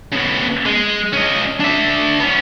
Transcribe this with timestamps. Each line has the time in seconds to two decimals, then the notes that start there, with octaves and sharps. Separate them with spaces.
0.12 C#3 B3
0.66 G#3
1.13 C#4 D#5
1.60 D4 E5
2.20 B3 C#4